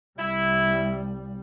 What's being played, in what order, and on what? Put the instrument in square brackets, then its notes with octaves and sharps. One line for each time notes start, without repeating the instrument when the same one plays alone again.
[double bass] C2 G3 [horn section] E4